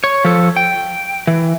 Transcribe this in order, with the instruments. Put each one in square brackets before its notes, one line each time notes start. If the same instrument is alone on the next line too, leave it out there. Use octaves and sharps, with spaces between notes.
[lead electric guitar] C#5
F3 A4
G5
E3